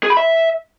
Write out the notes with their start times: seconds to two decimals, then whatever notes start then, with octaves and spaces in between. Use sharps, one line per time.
0.03 G#4
0.10 B5
0.17 E5